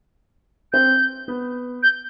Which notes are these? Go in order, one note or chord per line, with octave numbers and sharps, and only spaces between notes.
C4 G6
B3
G6